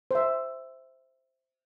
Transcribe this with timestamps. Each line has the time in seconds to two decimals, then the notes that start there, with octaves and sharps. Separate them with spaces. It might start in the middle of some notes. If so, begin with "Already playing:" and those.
0.11 C5 E5